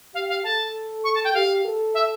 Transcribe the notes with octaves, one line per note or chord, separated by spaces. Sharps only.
G4 F5
F5
A4 A5
C#6
A5
G5
G4 F5
A4
E5